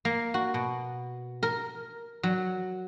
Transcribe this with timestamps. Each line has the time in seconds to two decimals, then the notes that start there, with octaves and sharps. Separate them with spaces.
0.05 A#3
0.34 F#4
0.54 B2
1.43 A#4
2.23 F#3